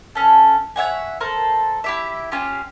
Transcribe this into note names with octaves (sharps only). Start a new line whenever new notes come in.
C#4 A4
C#5 E5 F#5 G#5
A4 A#4 C5
E4 G4 E5
C#4 F4 G4